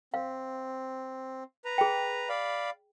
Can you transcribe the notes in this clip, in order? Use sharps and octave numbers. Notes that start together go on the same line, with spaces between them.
C4 F5
B4 A#5
G#4 G5
D5 F5 B5